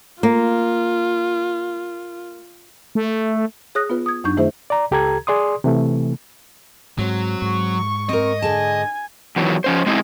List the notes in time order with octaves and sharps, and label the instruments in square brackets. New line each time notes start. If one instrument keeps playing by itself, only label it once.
[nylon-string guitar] A#3 [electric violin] F4
[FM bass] A3
[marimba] G#4 C#5 D#6 F#6 A#6
B3 F4 B4
D#6 G#6
F#2 F#3 D4 D#4 C#6 G6
D#3 A3 E4 G#4 C5 E5
[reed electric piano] D5 A#5
C#2 G4 A4 A#5 G#6
G#4 D5 C6 D#6
C3 E3 A3
[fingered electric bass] G#2 [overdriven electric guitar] F#3 [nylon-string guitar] C4 C#5
[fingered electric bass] G#2 [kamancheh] C#6
[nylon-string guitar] C4 A#4 [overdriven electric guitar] D#5
[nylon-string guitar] D3 G#4 A5 [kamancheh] G#5
[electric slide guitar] E2 D#3 E3 F#3
F3 C#4 C5
G#3 C4 D#4 E4 G4 G#4